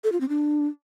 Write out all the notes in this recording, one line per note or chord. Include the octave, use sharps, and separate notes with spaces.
A4
F4
C4
D4